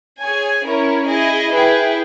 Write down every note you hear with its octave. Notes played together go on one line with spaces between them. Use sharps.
G#4 C#5 G#5
C#4 E4 A#4 C#5
E4 G#4 D#5
E4 G#4 B4 G5